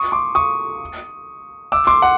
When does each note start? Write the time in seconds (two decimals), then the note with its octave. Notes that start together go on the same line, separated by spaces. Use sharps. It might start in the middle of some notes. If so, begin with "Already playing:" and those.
Already playing: C#6 D#6
0.12 C6 D6
0.35 C#6 D#6
1.72 D6 E6
1.87 C6 D6
2.02 F#5